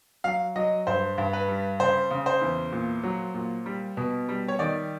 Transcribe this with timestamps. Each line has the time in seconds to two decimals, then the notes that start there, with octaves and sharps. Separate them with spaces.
0.24 F#3 F5
0.56 F#3 D#5
0.87 G2 C5
1.18 G2
1.33 B4
1.48 G3
1.80 C#3 C5
2.10 C#3
2.26 C5
2.41 E2
2.72 A#2
3.04 F#3
3.34 A#2
3.66 G3
3.97 B2
4.29 G3
4.48 C#5
4.59 D#3 D5